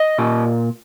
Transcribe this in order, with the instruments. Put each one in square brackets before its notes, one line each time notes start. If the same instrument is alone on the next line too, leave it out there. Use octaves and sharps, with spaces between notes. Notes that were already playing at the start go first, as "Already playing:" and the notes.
Already playing: [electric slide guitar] D#5
A#2